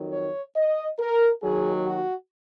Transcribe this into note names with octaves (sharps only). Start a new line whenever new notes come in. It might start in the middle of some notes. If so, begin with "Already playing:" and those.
Already playing: F2 D#3 F#3
C#5
D#5
A#4
D#2 D#3 F#3 G#4
F#4